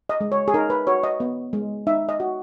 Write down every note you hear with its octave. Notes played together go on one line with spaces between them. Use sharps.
D#5
G#3
C#5
G#4
D#4 A#4
B4
F#4 C#5
D#5
B3
G#3
D#4 E5
D#5
F#4